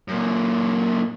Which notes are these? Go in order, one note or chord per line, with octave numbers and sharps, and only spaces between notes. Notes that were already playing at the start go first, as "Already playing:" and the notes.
F#2 A#2